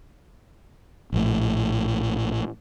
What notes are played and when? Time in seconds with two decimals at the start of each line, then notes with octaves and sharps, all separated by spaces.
1.13 A#1 A2